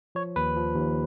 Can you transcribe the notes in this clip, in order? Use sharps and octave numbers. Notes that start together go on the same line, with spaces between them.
F3 C#5
D#2 B4
F3
D#2